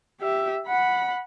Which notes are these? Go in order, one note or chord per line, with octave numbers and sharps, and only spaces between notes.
G4 E5
F#5 B5